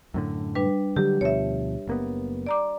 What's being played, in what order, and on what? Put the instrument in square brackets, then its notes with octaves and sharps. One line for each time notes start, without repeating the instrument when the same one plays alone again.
[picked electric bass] F#2 A2 D3
[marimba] G3 D4 B4
[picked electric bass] D3 F#3 G3 [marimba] G4
[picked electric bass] D2 B2 F3 [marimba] C#5 E5
[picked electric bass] F#1 A#3 B3
[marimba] D5 A#5 D6